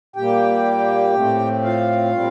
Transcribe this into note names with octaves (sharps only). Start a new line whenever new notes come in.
A#2 G3 A#3 G4 G5
A2 A3 C4
F4 F5
A#2 G3 C4